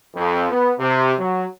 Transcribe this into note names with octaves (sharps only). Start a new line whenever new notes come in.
F2
B3
C3
F#3